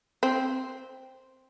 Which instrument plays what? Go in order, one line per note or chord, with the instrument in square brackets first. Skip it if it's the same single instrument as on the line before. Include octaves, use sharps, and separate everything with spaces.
[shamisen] C4